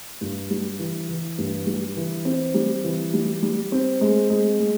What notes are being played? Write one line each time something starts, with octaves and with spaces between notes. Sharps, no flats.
G2
G3
E3
E3
G2
G3
E3
C4
G3
E3
G3
G3
C4
G#3
G#3
G#3